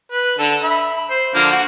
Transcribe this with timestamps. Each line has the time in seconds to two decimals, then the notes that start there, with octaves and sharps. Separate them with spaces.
0.12 B4
0.38 D3 A4
0.62 E5 B5
1.10 C5
1.35 D3 F3 A#3
1.52 F#4